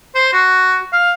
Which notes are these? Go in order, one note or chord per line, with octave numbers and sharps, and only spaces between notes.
C5
F#4
F5